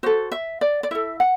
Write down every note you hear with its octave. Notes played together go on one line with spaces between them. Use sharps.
F#4 A4 C5
E5
D5
D5
E4 A4 E5
F#5